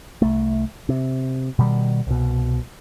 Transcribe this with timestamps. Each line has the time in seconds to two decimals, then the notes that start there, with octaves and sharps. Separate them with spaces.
0.22 C2 A3
0.89 C3
1.59 B2 D#3 G3
2.07 C2 B2